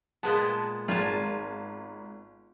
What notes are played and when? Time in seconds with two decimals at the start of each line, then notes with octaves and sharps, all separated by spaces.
0.23 A#2 G#3 B3 A5
0.88 G#1 F4 G#5 A5